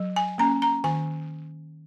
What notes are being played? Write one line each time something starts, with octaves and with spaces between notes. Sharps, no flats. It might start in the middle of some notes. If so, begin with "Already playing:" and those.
Already playing: F#3
G#5
A#3 C#4 A#5
A#5
D#3 G#5